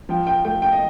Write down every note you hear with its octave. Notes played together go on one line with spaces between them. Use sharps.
F3 G5
G5
A3 G5
G5
D#5